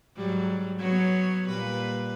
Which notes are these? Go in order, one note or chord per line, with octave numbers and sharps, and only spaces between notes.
G#2 F#3 G3
F#3 B3 C#5
A#2 G3 B4